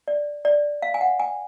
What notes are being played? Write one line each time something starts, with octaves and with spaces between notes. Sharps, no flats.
D5
D5
F5
G#5
F#5
G#5